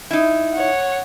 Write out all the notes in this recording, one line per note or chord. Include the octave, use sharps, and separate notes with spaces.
D#4 E4
C#5 F#5